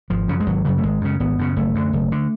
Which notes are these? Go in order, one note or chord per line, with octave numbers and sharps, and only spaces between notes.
G#1 F3
F#2 C#3
G#3
G#1 F#3
F#2 C#3 F#3
A3
G#1 G#3
F#2 C#3
G#1 B3
F#2 C#3
F#1 A3
F#2 D3
F#1
D3